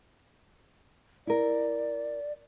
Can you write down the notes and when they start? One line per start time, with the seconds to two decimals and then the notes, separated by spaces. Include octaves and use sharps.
1.27 E4 A#4 D5